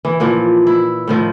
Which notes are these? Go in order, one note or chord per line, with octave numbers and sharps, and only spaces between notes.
E3
A#2 E3 F3
E4
A2 D#3 F3